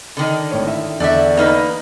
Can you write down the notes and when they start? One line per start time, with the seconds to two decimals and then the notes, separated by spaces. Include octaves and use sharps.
0.17 D3 D#3
0.51 G#1 A2 C#5
0.67 E4 E5
1.00 E2 D3 D5 E5
1.37 A#3 D#4 B4